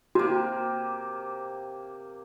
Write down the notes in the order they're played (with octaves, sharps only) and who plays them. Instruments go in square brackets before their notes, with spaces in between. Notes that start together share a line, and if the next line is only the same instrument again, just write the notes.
[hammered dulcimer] C3 A#3 [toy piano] F#4